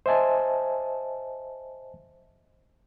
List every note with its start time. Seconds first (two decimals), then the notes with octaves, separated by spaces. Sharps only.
0.06 C5 D#5 E5 G#5 A5